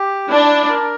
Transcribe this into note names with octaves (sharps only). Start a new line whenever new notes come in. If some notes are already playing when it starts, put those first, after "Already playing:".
Already playing: G4
D4 E4
A#4